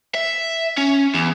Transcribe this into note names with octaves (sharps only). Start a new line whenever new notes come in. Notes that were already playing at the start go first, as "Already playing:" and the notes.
E5
C#4
E2